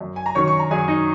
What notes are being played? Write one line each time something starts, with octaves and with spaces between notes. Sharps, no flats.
F#2
G#5
A#5
D#3 F#3 C#4 C#5 C#6
C#6
A#5
F#2 G#4 G#5
D#4 D#5